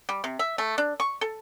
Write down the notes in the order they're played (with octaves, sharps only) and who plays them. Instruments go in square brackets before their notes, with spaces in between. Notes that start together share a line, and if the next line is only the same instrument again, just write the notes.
[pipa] G3
C3
E5
A3
D4
C#6
A4